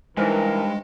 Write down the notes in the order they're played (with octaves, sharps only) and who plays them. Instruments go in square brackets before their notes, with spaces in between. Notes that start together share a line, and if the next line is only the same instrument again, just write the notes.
[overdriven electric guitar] G2 [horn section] E3 A#4 [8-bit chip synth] G#3 [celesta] D#4 C5 G#5